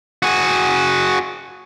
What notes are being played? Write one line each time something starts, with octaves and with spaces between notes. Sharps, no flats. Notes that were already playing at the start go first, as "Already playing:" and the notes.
F#4 G#4